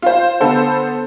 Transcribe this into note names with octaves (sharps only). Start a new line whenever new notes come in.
F4 C5
D3 B3 A4 C5